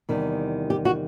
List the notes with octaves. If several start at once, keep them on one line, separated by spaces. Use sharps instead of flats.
E2 C3 D#3 G3
G4
F#4